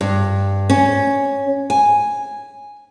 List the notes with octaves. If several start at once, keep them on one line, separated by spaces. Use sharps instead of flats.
G2
C#4
G#5